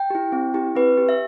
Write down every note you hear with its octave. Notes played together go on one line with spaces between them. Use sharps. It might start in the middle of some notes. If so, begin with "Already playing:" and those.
Already playing: G5
E4 G4
C4
E4 G4
C4 B4
G4
E5